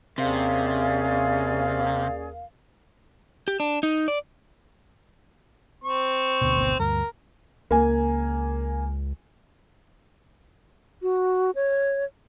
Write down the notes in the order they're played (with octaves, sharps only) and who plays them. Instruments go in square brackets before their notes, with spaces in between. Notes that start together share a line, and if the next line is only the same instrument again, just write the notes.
[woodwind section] D#2 A#4 F5 [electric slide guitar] C3 [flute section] C#4 G#4 D5
[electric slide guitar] G4
D4
D#4
D5
[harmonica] C4 C#6
[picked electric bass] D2 B2
G#1 D2 B2
[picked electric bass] D2 G2 [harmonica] A#4
[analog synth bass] C#2 [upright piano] A#3 G#5
[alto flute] F#4
C#5